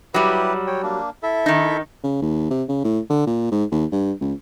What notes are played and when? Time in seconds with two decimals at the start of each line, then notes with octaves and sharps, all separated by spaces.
0.14 F#3 G3 E4 G4 B4
0.67 C#5 G5
0.83 A#3 D4
1.23 E4 A4 E5
1.46 D#3 D#4
2.03 C#3
2.22 D#2
2.50 C3
2.69 C#3
2.84 A2
3.09 D3
3.26 A#2
3.52 G#2
3.71 D#2
3.92 G2
4.21 C#2